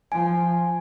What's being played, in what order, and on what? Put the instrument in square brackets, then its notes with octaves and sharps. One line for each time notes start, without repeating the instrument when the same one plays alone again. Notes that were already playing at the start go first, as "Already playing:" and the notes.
[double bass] F3 [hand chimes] G#5